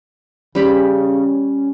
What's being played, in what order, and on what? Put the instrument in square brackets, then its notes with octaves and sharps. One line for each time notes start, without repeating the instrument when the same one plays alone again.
[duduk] C#3 [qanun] G3 G4 B5 [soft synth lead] C#4